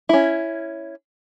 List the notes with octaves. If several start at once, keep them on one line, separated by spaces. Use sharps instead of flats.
C#4 E4